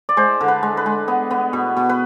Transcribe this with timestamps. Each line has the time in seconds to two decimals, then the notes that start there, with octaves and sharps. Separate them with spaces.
0.09 D5
0.17 G#3 C5
0.41 D3
0.48 B4
0.63 G#3
0.77 B4
0.86 G#3
1.08 B3
1.31 B3
1.53 B2
1.77 B2
1.89 B4